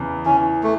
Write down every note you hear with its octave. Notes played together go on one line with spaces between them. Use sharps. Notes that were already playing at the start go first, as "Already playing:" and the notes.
Already playing: E2 C#3
E3 C#4
A3